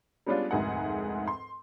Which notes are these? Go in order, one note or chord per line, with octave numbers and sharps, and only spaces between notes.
G3 G#3 B3 C#4 D4 F4
F1 D2 G#2 G#4 A#4 F#5
C6